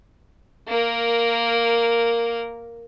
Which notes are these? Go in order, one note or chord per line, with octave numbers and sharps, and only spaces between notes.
A#3 A#4